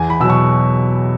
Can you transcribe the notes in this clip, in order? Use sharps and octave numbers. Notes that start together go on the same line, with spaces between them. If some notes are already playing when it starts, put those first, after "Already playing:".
Already playing: E2 G#5
B5
B2 F#3 E6
C#6